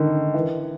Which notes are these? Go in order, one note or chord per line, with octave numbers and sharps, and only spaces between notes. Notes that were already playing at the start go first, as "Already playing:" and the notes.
Already playing: D3 D#3
E3